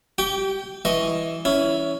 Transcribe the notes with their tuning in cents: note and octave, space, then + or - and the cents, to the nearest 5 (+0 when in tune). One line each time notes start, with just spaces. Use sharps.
G4 -15 G5 +0 D6 -45
E3 +0 D#5 +0 C#6 +0
C#4 +10 E4 +0